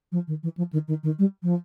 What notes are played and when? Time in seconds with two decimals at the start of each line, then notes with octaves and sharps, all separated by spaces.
0.12 F3
0.28 D#3
0.43 E3
0.57 F3
0.73 D#3
0.88 D#3
1.03 D#3
1.19 G3
1.43 F3